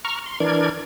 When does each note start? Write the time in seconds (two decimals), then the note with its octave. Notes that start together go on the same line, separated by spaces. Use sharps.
0.05 A#5 C#6 F6
0.26 C6
0.40 E3 D4 A#4 D5 G#6